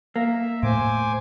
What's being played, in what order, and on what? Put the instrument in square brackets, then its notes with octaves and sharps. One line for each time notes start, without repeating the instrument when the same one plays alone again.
[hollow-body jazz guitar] A#3 [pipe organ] E5
[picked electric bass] A2 A3 [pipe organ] C5 G#5 D6